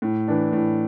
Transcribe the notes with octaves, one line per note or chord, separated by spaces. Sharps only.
A2
E3 D4
A2